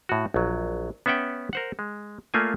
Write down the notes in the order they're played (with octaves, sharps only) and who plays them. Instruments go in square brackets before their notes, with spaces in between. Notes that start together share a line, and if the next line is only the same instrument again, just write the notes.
[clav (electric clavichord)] A2 F#4
A#1 F#3
B3 C#4 E5 F#5 G5
A#4 C5 F#5
G#3
A3 A#3 F4 D5 G#5